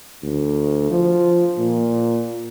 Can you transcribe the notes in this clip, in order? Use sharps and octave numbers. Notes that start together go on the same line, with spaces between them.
D2
F3
A#2